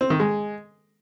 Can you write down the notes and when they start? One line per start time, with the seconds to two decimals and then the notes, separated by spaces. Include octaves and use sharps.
0.01 C4
0.10 D#3
0.20 G#3